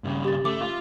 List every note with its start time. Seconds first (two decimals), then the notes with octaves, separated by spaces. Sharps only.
0.04 G2 C#3
0.25 G4 A6
0.45 A3 D6
0.61 F4